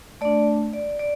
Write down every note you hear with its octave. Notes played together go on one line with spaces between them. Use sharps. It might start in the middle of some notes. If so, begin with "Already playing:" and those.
A3 D4 D5
D5
D5